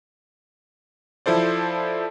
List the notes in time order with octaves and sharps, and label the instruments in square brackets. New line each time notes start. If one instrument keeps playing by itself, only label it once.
[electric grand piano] F3 E4 A4 C5 D5